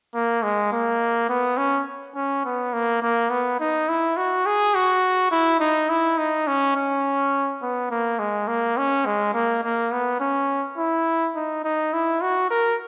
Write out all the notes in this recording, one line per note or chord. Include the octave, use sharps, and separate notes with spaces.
A#3
G#3
A#3
B3
C#4
C#4
B3
A#3
A#3
B3
D#4
E4
F#4
G#4
F#4
E4
D#4
E4
D#4
C#4
C#4
B3
A#3
G#3
A#3
C#4
G#3
A#3
A#3
B3
C#4
E4
D#4
D#4
E4
F#4
A#4